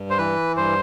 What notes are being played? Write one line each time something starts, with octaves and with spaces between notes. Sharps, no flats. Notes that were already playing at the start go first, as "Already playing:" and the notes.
Already playing: G2
C5
E3 B4
G2 C5